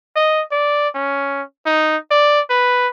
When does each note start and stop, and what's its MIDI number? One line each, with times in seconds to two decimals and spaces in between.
0.16 0.43 75
0.52 0.88 74
0.95 1.42 61
1.66 1.97 63
2.11 2.41 74
2.50 2.88 71